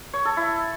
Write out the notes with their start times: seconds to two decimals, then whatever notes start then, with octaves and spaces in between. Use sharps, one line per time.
0.13 C#5
0.25 A4
0.37 E4